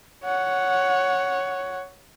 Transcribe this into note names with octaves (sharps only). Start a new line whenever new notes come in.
C#5 F#5